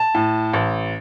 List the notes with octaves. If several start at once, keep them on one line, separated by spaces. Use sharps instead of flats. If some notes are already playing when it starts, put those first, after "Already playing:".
Already playing: A5
A2
A1